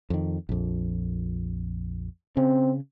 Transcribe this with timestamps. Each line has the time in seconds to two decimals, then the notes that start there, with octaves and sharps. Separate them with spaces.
0.10 F2 D#3
0.49 A#1 F2
2.37 C#3 C4